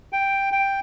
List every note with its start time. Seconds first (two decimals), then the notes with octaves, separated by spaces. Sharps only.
0.13 G5
0.52 G5